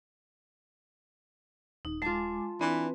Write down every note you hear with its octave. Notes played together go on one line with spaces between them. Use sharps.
D#1 D#4
G#3 F4 G#5 A5 D6
E3 C4 D4 B4